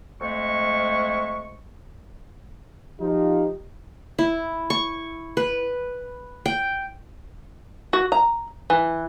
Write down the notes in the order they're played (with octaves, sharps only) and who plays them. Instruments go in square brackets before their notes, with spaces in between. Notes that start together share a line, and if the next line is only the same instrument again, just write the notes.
[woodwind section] F2 G#3 A3 C#6
[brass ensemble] F3 D#4 F4 [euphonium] G4
[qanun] E4
C#6
B4
G5
[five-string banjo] F#4
A#5
E3